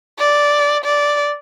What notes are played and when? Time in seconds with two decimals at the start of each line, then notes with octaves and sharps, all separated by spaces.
0.19 D5
0.84 D5